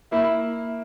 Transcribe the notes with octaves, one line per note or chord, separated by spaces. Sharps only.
A#3 E4